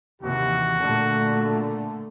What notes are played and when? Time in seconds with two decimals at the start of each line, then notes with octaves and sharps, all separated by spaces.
0.21 D#2 C3 E3 F#4
0.80 A#2 D3 A3